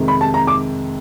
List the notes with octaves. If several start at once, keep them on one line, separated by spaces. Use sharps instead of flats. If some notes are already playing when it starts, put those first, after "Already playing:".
Already playing: F2 C3 D#3 G#3
B5
A5
A#5
D6